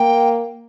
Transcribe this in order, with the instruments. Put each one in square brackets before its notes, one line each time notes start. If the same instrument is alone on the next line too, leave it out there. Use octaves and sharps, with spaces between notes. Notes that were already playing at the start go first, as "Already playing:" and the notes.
Already playing: [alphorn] A#3 [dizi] G5